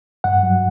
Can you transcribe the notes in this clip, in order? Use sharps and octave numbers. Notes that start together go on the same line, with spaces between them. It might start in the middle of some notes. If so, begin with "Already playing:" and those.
G2 F#5
F#3